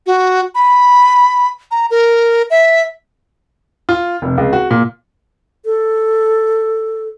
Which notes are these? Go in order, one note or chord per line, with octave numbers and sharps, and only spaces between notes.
F#4
B5
A#5
A#4
E5
F4
F1
C#2
F#4
A#2
A4